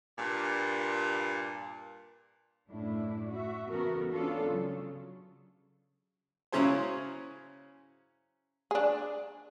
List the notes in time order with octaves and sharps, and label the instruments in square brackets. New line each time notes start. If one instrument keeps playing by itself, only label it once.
[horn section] G2 A#2
[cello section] F#2 A2 D4 E4
F#4 E5
E2 C#3 B3 F#4 A4 A#4
B3 C#4 D4 F4 A4
C#3 F#3
[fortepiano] C#3 F#3 C#4 E4 G#4 C5
[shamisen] D4 G#4